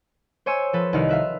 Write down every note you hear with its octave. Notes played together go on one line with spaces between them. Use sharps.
C5 C#5 G#5 C#6 E6
F3 A4 B4
C2 D#3 D#4 E4 F6
B4 E5 F5